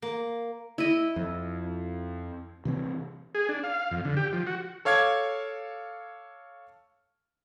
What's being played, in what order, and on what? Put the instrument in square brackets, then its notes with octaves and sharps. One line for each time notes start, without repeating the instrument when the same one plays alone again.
[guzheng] A#3
[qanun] E4 D#5
[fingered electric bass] F2
C3 E3 C4
[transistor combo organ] G#4
D4
F5
F2
D3
G4
F3
F#4
[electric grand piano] A4 C#5 F5 D6 G#6